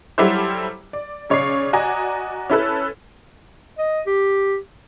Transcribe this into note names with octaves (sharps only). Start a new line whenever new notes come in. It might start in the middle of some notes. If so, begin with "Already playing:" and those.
F#3 G3 E4 G4 A4 C5
D5
B1 C#3 C#5 D5 C#6 C7
F#4 D5 D#5 G#5 A#5
C#4 E4 A4 B4
D#5
G4